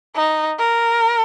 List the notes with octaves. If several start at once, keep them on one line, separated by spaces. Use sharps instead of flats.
D#4
A#4